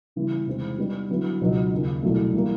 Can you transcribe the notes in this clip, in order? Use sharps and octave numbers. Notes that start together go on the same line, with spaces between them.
C#3 E3 G3 B3
E2 C3 D#3 G#3 C4
G3 B3 D#4
D3 F#3 B3 E4
C#2 B2 F#3 B3 D#4
D#2 C#3 F3
C2 B2 F#3 A3
E3 G3 A#3